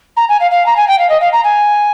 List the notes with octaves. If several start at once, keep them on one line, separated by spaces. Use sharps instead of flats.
A#5
G#5
F5
F5
A#5
G#5
G5
F5
D#5
F5
A#5
G#5